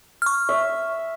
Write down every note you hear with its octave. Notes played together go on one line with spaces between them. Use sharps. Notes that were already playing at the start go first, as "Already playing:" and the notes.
C#6 F6
E5